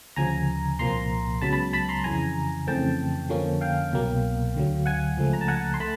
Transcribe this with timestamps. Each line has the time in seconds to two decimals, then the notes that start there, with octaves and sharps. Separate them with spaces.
0.16 D2 C#3 F3 G#5 A#5
0.79 C2 A#2 F3 A#3 A#5 C6
1.41 C#2 C#3 F#3 B3 A5 B5
1.53 A5 B5
1.73 A5 B5
1.89 A#5 C6
2.04 F2 C#3 E3 G#5 A#5
2.67 F2 C#3 E3 A3 C4 G5 A5
3.29 F2 D3 F3 A#3 C#4
3.61 F5 G5
3.92 C2 B2 F#3 A#3
4.55 D2 D3 F#3
4.86 F#5 G#5
5.17 C#2 C#3 F3 A3
5.33 A#5
5.41 A5
5.48 F#5 G#5
5.74 C6
5.80 A3 A5 B5